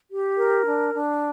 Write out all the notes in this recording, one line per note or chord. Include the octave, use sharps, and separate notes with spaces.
G4
A#4
D4
D4